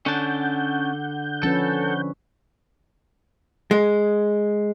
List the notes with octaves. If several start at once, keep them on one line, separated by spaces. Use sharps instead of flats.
D3 C#4 F#5 A5 G6
F3 C#4 A4 B4
G#3